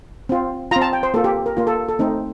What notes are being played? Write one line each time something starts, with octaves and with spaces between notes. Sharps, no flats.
C4 F4
C4 F4 A#5
A5
G5
C5
A#3 F4 A4
G4
A#4
A#3 F4
A4
A4
A3 C4 D#4